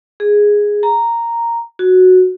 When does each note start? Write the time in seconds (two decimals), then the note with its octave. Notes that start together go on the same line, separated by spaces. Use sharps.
0.20 G#4
0.83 A#5
1.79 F#4